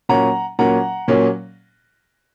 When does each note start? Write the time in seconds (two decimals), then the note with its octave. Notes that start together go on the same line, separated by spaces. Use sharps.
0.09 A#2 F#3 A#3 C#4 F#5 A#5
0.59 A#2 F#3 A#3 C#4 F#5 A#5
1.08 A#2 F#3 A#3 C#4